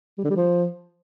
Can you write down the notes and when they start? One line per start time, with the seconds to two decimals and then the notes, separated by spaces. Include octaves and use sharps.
0.18 G3
0.24 D3
0.30 G3
0.36 F3